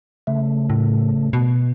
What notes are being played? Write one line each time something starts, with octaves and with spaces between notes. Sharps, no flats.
C#3 A3
A2
B2